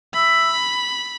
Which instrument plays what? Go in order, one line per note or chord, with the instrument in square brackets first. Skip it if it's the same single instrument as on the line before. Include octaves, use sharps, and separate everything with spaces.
[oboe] E5 [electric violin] B5